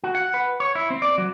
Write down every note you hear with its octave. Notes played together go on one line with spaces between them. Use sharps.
F#4
F#5
B4
C#5
E4
C4
D5
F#3